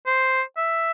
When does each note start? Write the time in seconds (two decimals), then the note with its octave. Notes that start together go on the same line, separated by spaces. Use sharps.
0.07 C5
0.57 E5